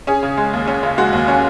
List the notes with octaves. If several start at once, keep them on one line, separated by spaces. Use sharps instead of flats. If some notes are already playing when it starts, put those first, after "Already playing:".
C#4 G#4
C#3
G#3
D#2
C#4
C#3
G#3 F#4
D#2
C#4